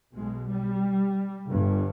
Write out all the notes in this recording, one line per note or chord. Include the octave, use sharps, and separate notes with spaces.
B1 B2 G#3
G3
G1 G2